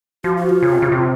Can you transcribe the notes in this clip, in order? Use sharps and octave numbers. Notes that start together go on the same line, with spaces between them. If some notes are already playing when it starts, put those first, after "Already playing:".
F3 F#4
F#4
F4
C#3
C3
C#3
C3